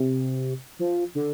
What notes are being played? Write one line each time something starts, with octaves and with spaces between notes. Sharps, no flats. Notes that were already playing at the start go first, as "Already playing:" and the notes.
Already playing: C3
F3
D3